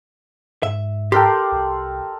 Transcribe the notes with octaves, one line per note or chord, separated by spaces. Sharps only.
G#2 E5
G4 A4 A#4 D5 G5 C6
C2